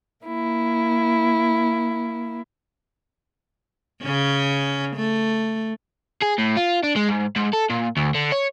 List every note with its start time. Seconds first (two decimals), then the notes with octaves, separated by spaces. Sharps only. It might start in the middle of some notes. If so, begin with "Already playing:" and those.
0.23 A#3 E4
4.03 C#3 C#4
4.96 A3
6.22 G#4
6.38 A2
6.57 F4
6.84 D4
6.96 G#3
7.09 G#2
7.36 G#2
7.53 A4
7.70 A#2
7.97 D2
8.14 D3
8.32 C#5